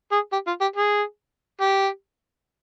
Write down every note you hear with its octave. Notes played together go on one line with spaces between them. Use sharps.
G#4
G4
F4
G4
G#4
G4